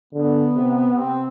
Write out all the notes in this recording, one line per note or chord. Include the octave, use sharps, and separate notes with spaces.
D3 B3
C3
C3 C4